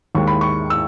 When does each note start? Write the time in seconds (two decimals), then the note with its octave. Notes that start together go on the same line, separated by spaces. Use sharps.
0.15 D#2 D#3 G#3 C#6
0.27 B5
0.41 C#6
0.70 E6